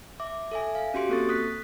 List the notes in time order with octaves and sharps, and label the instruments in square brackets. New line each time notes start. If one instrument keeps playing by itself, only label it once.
[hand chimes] E5 D6
A4 E5 G#5
F5
C#4 F#4 G4 C6 D7
A#3 C4 A4 C#6 A6
D#6 F#6 B6